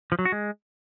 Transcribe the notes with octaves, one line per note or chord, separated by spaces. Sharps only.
F3
F#3
F#4
G#3